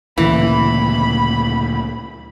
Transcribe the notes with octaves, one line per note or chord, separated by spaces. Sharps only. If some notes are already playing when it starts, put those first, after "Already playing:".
D2 A#2 C#3 E3 B5